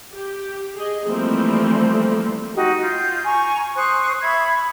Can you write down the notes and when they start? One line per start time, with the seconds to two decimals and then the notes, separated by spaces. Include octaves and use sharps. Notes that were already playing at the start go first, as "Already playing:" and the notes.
0.13 G4
0.75 G#4 D#5
1.06 E3 F3 G3 A3 A#3 C4
2.54 D#4 F#4 G4
2.81 F4 G6
3.24 G#5 A#5 C#6
3.76 C5 C#6 D#6 F#6
4.22 E5 B5 C#6 G#6